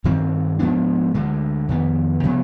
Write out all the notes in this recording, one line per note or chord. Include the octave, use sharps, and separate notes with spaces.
G2 D#3 G3 C4
G#2 F3 B3 D4
D2 D3 G#3
F2 D#3 B3
C3 F3 B3